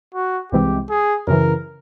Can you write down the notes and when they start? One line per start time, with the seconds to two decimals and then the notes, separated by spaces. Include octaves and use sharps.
0.14 F#4
0.52 C2 C3 E3 G#3 C4 G4
0.90 G#4
1.27 F#2 C#3 E3 A#4